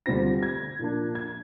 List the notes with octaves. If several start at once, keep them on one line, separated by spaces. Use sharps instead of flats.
D2 D3 G3 C4 F4 A#6
G#6
A#2 F3 A#3 D4
G#6